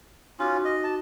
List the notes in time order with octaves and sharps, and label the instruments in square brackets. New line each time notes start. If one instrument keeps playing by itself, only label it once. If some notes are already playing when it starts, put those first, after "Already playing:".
[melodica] C#4 F4 [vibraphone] D#4 F#4 D6
[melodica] D#5
A5